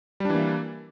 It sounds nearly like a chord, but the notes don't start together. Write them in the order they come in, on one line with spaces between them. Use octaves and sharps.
G3 D4 E3 A#3 E4